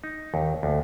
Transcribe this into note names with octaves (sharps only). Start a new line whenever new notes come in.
D#4
D#2
D2